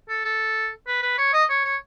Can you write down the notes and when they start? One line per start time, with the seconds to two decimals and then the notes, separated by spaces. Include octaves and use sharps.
0.09 A4
0.25 A4
0.87 B4
1.03 B4
1.18 C#5
1.33 D#5
1.49 C#5
1.65 C#5